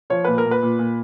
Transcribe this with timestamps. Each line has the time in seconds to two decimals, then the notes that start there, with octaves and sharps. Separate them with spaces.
0.10 F3 C#5
0.24 A#2 B4
0.38 A#4
0.45 A#2
0.51 B4
0.62 A#2
0.79 A#2